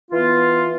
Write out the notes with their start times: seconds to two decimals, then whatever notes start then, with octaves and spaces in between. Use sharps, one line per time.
0.10 E3 B3 F4